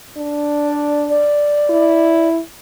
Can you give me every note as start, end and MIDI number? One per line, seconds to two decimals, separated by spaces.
0.17 1.27 62
0.68 1.05 74
1.09 2.29 74
1.70 2.40 64